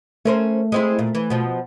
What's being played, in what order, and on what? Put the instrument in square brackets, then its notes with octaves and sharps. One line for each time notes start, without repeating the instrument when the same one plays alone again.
[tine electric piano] A3 [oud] C#4 A#4 C5
[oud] G#3 C4 E4
A#2
E3
B2 F3